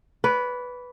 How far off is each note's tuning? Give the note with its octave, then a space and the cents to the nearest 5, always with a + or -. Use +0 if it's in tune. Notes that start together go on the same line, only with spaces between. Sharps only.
B4 +0 D5 -40